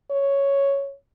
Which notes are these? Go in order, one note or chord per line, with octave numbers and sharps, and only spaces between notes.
C#5